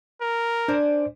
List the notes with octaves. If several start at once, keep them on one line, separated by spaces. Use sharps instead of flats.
A#4
D4 C5 D5 G#5